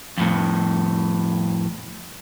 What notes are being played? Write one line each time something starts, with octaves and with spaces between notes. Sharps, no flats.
F2 A2